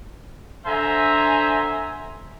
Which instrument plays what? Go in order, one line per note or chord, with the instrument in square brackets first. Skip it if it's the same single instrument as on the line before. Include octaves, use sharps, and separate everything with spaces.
[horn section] D3 C5 E5 G#5 A#5